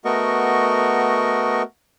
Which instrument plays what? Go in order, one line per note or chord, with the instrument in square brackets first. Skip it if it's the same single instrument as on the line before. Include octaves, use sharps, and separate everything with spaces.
[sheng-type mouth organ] A3 B3 F#4 A#4 D#5 C#6